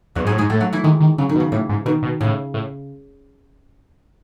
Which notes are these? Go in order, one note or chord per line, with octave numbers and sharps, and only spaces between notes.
E2 F#3 F#4
G#2 G#3 G#4
A2
G#2 G#3 G#4
A2 A3 A4
F#3 F#4
E3 E4
D#3 G#3
D#3
C#3 F#3
D#3
B2
C#3
A2 E3
G#2
B2 D#3
B2
A2 C#3
A2